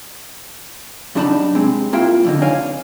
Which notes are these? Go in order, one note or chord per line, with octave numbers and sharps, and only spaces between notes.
F#2 G3 D4 D#4 A5 B5
C3 G#3 C4
A#3 E4 F4 E5 G5
F2 D3 D#4
C#5 D5 F5 G#5